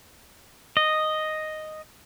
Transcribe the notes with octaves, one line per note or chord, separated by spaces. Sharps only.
D#5